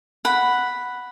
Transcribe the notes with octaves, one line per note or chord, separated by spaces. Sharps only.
F#5 B5